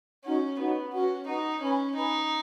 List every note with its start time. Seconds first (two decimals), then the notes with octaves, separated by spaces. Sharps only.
0.24 C#4 D#4 F#4 C#5 F#5
0.59 B3 D#4 F#4 C#5 F#5
0.92 C#4 F#4 B4 F#5
1.27 D#4 F#4 B4 F#5
1.61 C#4 B4 G#5 B5
1.95 D#4 B4 G#5 B5